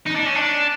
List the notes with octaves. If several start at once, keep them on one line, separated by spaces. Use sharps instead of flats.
D#4
D4
C#4
D4